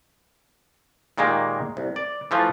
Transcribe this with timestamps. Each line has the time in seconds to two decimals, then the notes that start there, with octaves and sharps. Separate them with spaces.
1.18 A#2 D#3 G#3 A#3 G4
1.77 C2
1.96 D5
2.31 E3 F3 A3 F4